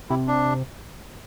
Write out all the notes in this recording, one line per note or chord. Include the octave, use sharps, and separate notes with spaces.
C3 E4
D4